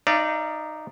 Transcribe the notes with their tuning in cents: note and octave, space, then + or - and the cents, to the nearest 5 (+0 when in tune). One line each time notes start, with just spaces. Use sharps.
D#4 -5 D5 +0 F5 -40